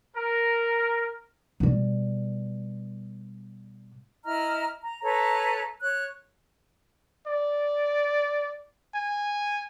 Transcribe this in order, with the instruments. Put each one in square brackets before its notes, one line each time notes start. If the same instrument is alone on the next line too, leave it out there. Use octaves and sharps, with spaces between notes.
[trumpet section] A#4
[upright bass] B2 G3
[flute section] E4 D#5 A#5 F6
A#5
A4 B4 C#5 A#5
C#5 F#6
[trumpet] D5
G#5